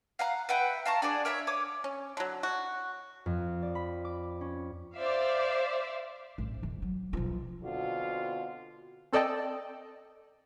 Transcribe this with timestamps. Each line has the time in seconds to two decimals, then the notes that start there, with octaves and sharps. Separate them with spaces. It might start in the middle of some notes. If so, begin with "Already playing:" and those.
0.19 F5 F#5 A#5
0.49 B4 E5 F#5 G5
0.86 F5 A5 A#5 C#6
1.02 D4 F#4 G#4 D5
1.25 A#4 C#5 E5 E6
1.47 C#5 D6 D#6
1.84 C#4
2.17 D3 F#3
2.43 F#4
3.26 F2
3.62 D5
3.75 B5
4.05 D6
4.41 C#4
4.97 C5 D5 E5 F5
6.38 A1
6.62 D#1 D#3
6.82 F#3
7.13 B1 F3
7.63 B2 D3 C4 F4 F#4
9.13 C4 A4 D5 D#5 G5 A5